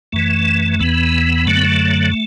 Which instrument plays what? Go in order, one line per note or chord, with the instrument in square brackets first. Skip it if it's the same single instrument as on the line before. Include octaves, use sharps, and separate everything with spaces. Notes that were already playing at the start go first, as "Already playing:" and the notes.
[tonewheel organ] F#2 E3 A3
E2 E3 B3
F#2 D3 F#3 A3
B3
A3